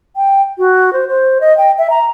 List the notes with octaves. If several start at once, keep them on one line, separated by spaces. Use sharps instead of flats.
G5
F#4
C5
C5
D#5
G5
E5
A#5